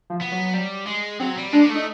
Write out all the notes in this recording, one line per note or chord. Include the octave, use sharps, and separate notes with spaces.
F3
B3
F#3
G3
G#3
F#3 C4
G3
G#3 D4
A#3
A3
D#4